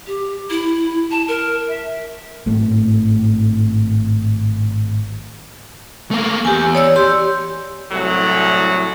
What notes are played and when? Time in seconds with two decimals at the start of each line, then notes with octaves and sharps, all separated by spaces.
0.07 G4
0.50 E4
1.11 A5
1.28 A#4
1.68 E5
2.46 G#1 A2 A3
6.11 A3 A#3
6.45 E2 G4 G#5
6.75 C#5 D5 E6
6.96 G4 C6
7.91 C2 A2 F#3